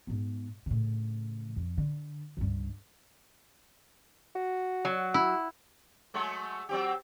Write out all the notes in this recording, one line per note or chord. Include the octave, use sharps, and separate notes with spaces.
G#2 B3
A2 C#3
F2
D3
C#2 G2
F#4
F#3
E4
F#3 G#3 A3
F#3 C4 G4